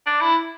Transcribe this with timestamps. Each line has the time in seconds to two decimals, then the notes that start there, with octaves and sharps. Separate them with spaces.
0.06 D4
0.21 E4